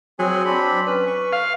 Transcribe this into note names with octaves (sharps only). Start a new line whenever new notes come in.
F#3 C4 G#4 G#5
C4 D4 B5
C#4 B4
C#6
F5